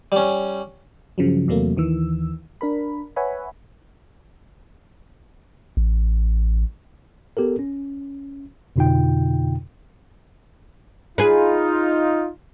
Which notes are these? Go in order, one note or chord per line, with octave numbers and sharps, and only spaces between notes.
G3 C#4
G2 C#3 F3 F#3
E2 C3 F#3 A3 A#3
D#2 D#3 E3 E6
D4 A#4 B5
B4 C#5 E5 F#5 G#5 B5
A1
B3 G4 A4 A#4
C#4
F2 B2 D3 D#4 F4 G5
D#4 F4 G#4 B4